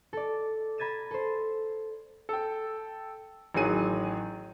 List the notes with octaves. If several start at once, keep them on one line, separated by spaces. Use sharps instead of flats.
A4 D5
A#5 B5 G#6 A6 D#7 E7
A4 C5
A4 G5
A1 D#3 F#3 G#4 D#7